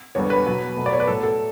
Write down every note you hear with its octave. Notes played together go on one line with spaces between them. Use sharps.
E2 D3 G3 B3 C#5
B4
B2 F#3 B3
B2 F#3 A3
D5
C#5
B4
A2 F#3 A3 A4
A4